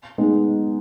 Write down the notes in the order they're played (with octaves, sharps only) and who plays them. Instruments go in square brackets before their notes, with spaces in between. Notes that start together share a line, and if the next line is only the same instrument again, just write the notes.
[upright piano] G#3 B3 D#4